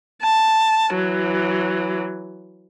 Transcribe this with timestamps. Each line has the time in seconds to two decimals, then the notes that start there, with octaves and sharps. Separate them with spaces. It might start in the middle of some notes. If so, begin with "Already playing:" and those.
0.23 A5
0.94 E3 F#3